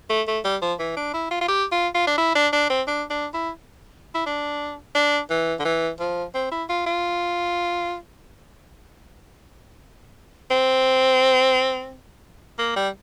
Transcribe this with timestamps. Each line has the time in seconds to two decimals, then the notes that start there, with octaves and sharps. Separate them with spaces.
0.10 A3
0.28 A3
0.45 G3
0.62 F3
0.79 E3
0.97 D4
1.14 E4
1.31 F4
1.41 F4
1.48 G4
1.72 F4
1.95 F4
2.07 D4
2.18 E4
2.36 D4
2.53 D4
2.70 C4
2.87 D4
3.11 D4
3.34 E4
4.15 E4
4.26 D4
4.95 D4
5.30 E3
5.60 D3
5.65 E3
6.00 F3
6.35 C4
6.52 E4
6.69 F4
6.86 F4
10.51 C4
12.59 A#3
12.76 G3